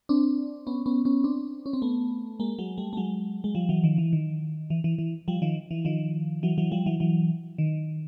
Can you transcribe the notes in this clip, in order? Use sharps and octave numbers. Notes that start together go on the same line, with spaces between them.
C4 D4
B3 C#4
B3 C#4
B3 C#4
C4 D4
C#4
C4
A3 B3
G#3 A#3
F#3 G#3
G3 A3
A3
F#3 G#3
G#3
F3 G3
E3 F#3
D#3 F3
E3
D#3
E3
E3
E3
F3 G3
D#3 F3
E3
D#3 F3
E3 F#3
E3 F#3
F3 G3
E3 F#3
E3 F#3
D#3